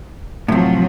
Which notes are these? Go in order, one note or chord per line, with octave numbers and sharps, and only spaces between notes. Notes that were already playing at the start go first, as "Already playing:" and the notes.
A2 C3 F3 F#3